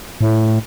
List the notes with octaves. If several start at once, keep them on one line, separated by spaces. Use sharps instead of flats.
A2